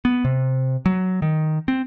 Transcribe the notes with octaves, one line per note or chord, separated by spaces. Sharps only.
B3
C3
F#3
D#3
C4